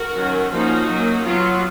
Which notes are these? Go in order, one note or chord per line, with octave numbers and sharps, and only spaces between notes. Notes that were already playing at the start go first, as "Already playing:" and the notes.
Already playing: F#4 A#4
D#3 F#3 C#4
F3 A#3 C#4 D#4 F#4
F#3 A#3 C#4
F#3 B3 F4